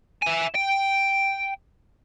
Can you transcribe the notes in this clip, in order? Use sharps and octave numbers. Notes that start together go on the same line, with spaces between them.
E4 G#5
G5